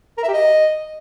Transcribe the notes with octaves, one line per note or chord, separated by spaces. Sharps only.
A#4
E5
G4
D#5